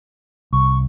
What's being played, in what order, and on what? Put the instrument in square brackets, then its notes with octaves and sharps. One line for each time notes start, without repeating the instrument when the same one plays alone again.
[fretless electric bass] C2 [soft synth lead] C#6